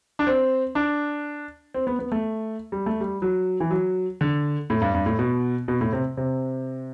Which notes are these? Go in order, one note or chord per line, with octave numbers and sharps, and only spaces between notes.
D4
C4
D4
C4
B3
B3
A3
G3
A3
G3
F#3
E3
F#3
D3
A2
G2
G2
A2
B2
B2
A2
C3
C3